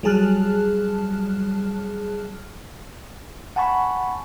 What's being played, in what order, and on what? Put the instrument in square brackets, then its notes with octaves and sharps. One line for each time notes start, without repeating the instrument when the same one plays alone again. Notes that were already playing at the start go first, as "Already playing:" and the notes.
[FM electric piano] F#3 G3 G#4 A5 F6 F#6
[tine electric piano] F#5 G#5 A5 B5 C#6